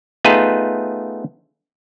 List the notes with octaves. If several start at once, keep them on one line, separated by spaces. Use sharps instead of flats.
A3 B3 D#4 F4 G#4 B4